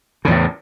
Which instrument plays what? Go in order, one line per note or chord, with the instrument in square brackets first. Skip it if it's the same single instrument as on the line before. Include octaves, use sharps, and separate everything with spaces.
[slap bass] C#3
E2
A2